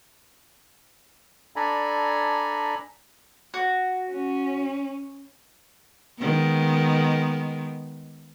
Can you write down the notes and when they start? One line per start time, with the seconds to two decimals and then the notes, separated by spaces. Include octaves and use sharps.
1.56 D4 A4 D5 G#5 A#5 B5
3.54 F#4
4.11 C#4
6.19 D#3 G#3 B3